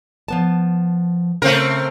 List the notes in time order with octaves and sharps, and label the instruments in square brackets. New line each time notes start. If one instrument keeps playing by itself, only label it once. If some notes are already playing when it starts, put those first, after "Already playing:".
[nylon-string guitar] F3 B3 A5
[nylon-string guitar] C#3 [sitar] A3 C4 A#4